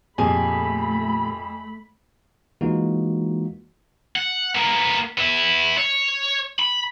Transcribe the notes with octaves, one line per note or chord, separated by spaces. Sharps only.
F2 A#2 F3 A3 G4 G#4 B5
E3 G#3 A#3 D#4 F4 F#4
F#5
A#3 B3
B3 E4
C#5
B5